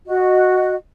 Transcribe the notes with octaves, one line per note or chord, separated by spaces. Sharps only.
F#4 D#5